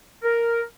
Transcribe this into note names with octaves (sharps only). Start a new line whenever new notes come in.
A#4